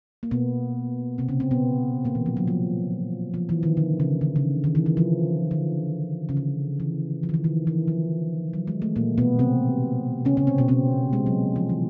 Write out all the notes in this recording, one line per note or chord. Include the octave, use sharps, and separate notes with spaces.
A#3
B2 B3
C3 C4
C#3 C#4
C3 C4
B2 B3
A#2 A#3
E3
F3
F#3
F3
F3
E3
D#3
D3
C#3
D3
C#3
D#3
E3
E3
F3
D3
C#3
D3
E3
F3
D#3
E3
D#3
E3
F3
F#3
G#3
A3
A#2 A#3
B2 B3
C3 C4
C#3 C#4
C#3 C#4
C3 C4
B2 B3
C3 C4
G#3
F#3
F3
E3